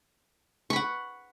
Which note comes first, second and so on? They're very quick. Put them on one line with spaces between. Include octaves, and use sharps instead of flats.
C#6 B5 F#5